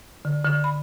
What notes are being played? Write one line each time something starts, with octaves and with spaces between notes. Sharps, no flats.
D3
D3
B5